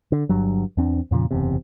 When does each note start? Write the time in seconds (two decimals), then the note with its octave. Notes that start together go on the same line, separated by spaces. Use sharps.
0.12 D3
0.29 G1 G2 F#3
0.77 E2 C4 D4
1.11 F2 A#2 C#3 F3
1.31 F#1 E2 C3